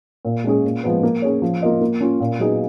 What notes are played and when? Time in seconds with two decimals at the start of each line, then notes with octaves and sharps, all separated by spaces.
0.25 A#2
0.44 G#3 C#4 G#4
0.65 A#2
0.84 F3 G#3 B3
1.03 A#3
1.22 C#4 G#4 C#5
1.42 F3
1.62 A#3 F4 A#4 D#5
1.81 A#3
2.01 C#4 F4
2.20 A#2
2.40 F#3 B3 D#4 G#4